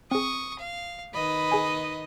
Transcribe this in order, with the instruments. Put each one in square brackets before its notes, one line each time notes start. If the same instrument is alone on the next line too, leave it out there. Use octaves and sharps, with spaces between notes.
[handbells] C4 G#4 [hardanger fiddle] C#6 D#6
[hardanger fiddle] F5
[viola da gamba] D#3 D#5 [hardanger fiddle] B4 B5
[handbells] G#4 G#5